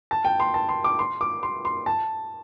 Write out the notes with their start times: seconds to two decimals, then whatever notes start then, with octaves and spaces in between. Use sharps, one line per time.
0.11 A5
0.25 G5
0.40 C6
0.54 A5
0.69 C6
0.84 D6
0.99 C6
1.21 D6
1.43 C6
1.65 C6
1.86 A5